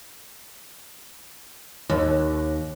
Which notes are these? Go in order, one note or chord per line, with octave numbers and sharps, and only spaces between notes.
D#2